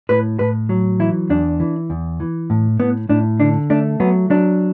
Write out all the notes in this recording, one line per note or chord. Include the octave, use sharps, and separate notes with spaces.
A2 B4
A2 B4
F#3
E3 E4
E2 D4
E3
E2
E3
A2
A2 B3
A2 D4
D3 D4
A3 D4
F#3 B3
F#3 D4